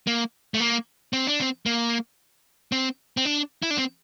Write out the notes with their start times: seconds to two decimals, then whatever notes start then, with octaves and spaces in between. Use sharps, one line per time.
0.07 A#3
0.54 A3
0.60 A#3
1.13 C4
1.27 D4
1.41 C4
1.66 A#3
2.72 C4
3.17 C4
3.25 D4
3.62 E4
3.70 D4
3.78 C4